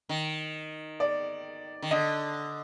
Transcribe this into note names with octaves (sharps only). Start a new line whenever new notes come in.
D#3
D5
D#3
D3 D#5